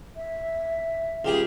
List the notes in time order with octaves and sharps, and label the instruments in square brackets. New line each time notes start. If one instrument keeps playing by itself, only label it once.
[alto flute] E5
[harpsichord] C#2 G4 G#4